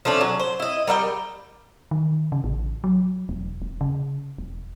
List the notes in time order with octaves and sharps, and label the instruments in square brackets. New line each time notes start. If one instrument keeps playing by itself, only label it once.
[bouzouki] F3 A3 C#4 D4
F#3
C5
E4 D#5
G3 A#4 E5 G5
[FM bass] D#3
C#3
A1
F#3
E1
E1
C#3
E1